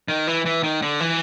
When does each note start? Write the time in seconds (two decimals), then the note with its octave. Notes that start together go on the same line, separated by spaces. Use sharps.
0.09 D#3
0.27 E3
0.45 E3
0.63 D#3
0.82 D3
1.00 E3